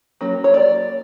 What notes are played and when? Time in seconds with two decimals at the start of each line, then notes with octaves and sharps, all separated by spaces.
0.21 F#3 A#3 C#4
0.44 C#5
0.54 D5